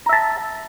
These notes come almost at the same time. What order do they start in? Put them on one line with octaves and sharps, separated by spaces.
A#5 E5 A5